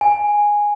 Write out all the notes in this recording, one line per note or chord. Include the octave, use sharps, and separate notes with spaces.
G#5